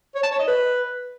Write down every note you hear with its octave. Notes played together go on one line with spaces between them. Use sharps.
C#5
A5
C#5
D#5
B4